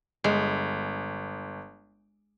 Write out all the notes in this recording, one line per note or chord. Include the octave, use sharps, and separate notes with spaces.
G1 G#3